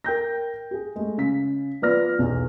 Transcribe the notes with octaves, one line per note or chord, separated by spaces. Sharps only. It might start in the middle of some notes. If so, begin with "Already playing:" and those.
A#4 G5 G6 A#6
G4 G#4
G#3 A3
C#3 B6
F3 B3 B4 D5 F6 A#6
B1 E2